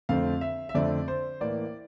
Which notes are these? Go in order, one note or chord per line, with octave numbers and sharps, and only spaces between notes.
F2 D3 A3 C4 F5
E5
E5
F2 D3 A3 C4 D5
C5
A2 E3 A#3 D5